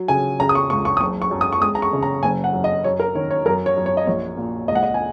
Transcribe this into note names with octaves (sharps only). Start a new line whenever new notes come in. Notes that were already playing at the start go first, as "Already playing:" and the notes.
Already playing: F#3
C#3 G#5
C#3 A#5
D#6
C#6
C#2 C#6
C#6
D#6
F#1 C#6
C#6
F#2
D#6
C#6
G#3 D#6
A#5
C#6
C#3
A#5
F#1 G#5
F#5
F#2
D#5
F#2 C#5
A#4
D#3 C#5
C#5
F#2 A#4
C#5
F#2
C#5
D#5
A#1 C#5
A#2
C#2 D#5
F#5
D#5
G#5